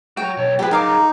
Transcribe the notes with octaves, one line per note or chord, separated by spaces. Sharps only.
F#3 F#4 G5
B1 C#5
F3 F#3 G4 G#4 B4
D#4 A#4 F5 D6